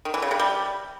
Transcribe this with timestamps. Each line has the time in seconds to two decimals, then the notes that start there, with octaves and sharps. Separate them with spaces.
0.05 D#3
0.14 E3
0.22 C#3
0.31 C3
0.40 G3